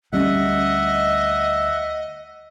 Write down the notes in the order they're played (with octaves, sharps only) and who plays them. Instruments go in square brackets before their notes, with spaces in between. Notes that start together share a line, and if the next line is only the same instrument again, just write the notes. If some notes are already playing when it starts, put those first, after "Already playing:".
[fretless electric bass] D2 G3 C#4 [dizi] D#5 [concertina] E5 F#5